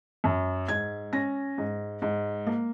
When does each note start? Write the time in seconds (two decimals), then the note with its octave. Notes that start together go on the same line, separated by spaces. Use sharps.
0.24 F#2
0.68 G#2 G#6
1.13 C#4 A#6
1.58 G#2
2.02 G#2
2.47 A#3